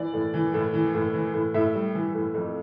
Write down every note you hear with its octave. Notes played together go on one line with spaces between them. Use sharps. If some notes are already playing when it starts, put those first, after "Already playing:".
Already playing: E3 D5
A2
E3
A2
E3
A2
E3
A2
A2 E5
G3
E3
A2
F2